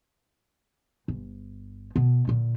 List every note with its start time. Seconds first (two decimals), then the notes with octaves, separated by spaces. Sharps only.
1.08 G1
1.96 B2 B3
2.27 A#2 D3